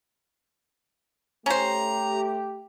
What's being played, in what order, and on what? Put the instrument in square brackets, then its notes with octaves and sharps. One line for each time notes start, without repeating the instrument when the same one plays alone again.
[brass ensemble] A3 G4 [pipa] C#4 C5 [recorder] A#5